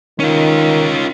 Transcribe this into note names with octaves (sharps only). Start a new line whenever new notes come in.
D#3 C#4 F4